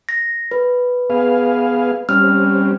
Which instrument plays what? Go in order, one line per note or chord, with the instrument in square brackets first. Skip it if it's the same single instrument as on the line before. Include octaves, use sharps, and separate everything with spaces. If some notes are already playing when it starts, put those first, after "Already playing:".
[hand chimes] A#6
B4
[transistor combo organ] B3 G#4 F5
[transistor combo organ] G3 C4 C#4 [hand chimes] F6